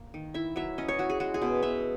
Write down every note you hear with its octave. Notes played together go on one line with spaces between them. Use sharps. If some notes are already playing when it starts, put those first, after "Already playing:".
Already playing: A#3
D#3
E4 E5
F#3 E5
C#4 D#5
C#5
E4 F#4
G#4
G#3 F#4
G#4
B2
B2 E5